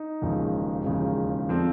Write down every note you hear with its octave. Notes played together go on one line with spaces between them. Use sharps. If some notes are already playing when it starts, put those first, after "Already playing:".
Already playing: D#4
E1 D#2 C#3 F3
E1 D#2 C#3 F3
D3 F3 C4